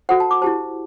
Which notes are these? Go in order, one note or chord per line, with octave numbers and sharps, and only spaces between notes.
F#4 A4 C5 F#5
A5
D6
E4 G4 C5 A5